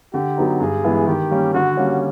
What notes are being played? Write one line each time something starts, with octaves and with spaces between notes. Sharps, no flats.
D3 G4
F#3 B3 D#4
G2 G#4
E3 G#3 B3 E4
D#3 G4
G3 A#3 C#4
D3 F#4
G3 A#3 C#4